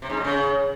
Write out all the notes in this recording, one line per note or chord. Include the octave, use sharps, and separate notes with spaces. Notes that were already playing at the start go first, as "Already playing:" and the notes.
C3
G#2
A2
C#3